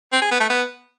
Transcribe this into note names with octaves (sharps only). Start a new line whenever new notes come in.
C4
G#4
B3
A3
B3